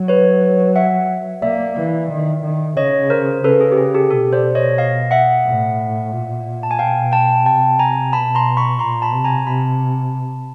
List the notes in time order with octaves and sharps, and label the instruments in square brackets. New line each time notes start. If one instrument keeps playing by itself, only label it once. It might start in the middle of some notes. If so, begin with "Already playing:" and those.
Already playing: [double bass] F#3
[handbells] B4 C#5
E5 F#5
[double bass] A#3 [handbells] D5 E5
[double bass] E3
D#3
D#3
[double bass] C#3 [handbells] C#5 D#5
[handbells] A#4 C5
[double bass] C#3 [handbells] A4 B4
[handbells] G#4
G4
G#4
G4 A4
[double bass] B2 [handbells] G4 A4
[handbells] C5 D5
C#5 D#5
D#5 F5
E5 F#5
[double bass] A2
A#2
[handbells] A5
G#5
[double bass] B2 [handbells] F5 G5
[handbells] G5 A5
[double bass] C3 [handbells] G5 A5
[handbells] G#5 A#5
[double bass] B2 [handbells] A5 B5
[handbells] A#5 C6
B5 C#6
[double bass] A#2 [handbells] A#5 C6
[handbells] A5 B5
[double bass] C3
[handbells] G#5 A#5
[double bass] C3 [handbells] A5 B5